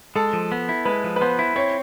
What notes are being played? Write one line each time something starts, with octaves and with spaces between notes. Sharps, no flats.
G#3 A4
F3
B3
E4
G#3 B4
F3
B4
B3 C5
E4
C4 C#5